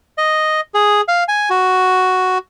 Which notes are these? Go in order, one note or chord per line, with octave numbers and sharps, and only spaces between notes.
D#5
G#4
F5
G#5
F#4